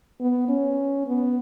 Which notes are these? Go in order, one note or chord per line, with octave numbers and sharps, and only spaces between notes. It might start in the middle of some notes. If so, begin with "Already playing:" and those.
B3
C#4
B3